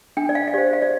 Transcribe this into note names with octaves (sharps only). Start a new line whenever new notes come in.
D4 G5
D5
F5
F5
G4 C5 D5
F5
D5